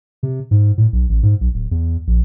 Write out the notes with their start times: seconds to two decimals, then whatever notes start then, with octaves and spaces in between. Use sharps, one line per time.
0.23 C3
0.51 G#2
0.78 A2
0.93 B1
1.09 A1
1.23 G#2
1.41 B1
1.54 D1
1.71 E2
2.07 A#1